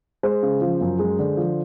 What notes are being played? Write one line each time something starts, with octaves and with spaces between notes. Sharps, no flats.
G#3 C5
C#3
F3
F#2
G#3
D3
F3